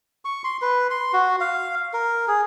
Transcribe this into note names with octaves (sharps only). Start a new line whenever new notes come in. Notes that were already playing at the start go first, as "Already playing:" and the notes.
C#6
C6
B4
C6
F#4
F5
A#4
G#4